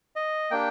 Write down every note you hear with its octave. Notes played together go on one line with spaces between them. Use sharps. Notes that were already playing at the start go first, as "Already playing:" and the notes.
D#5
A#3 D4 G4 G5